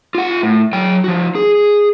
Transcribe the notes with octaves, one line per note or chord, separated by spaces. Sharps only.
F4 F#5
A2
F#3 G5
F3 F#4
G#4